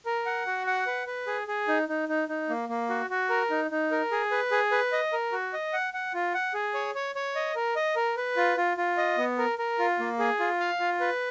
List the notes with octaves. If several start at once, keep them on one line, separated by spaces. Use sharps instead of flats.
A#4
F#5
F#4
F#5
B4
B4
G#4
G#4
D#4
D#4
D#4
D#4
A#3
A#3
F#4
F#4
A#4
D#4
D#4
A#4
G#4
B4
G#4
B4
D#5
A#4
F#4
D#5
F#5
F#5
F4
F#5
G#4
C#5
C#5
C#5
D#5
A#4
D#5
A#4
B4
F4
F4
F4
D#5
B3
A#4
A#4
F4
A#3
G#4
F4
F5
F4
B4